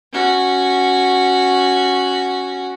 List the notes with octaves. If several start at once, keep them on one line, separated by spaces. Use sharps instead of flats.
C#4 F#4